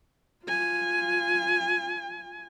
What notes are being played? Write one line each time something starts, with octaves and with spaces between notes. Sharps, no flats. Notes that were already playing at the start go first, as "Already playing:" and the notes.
F4 G#5